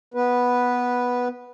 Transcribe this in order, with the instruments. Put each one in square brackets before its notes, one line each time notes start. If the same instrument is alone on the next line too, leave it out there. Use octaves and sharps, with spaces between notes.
[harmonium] B3 B4